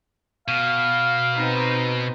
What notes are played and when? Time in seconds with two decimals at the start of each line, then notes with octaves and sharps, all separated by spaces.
0.48 B2 F5
1.36 C4 D#4 B4